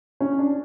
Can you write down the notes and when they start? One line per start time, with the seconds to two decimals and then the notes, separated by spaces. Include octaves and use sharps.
0.20 C#4
0.39 D4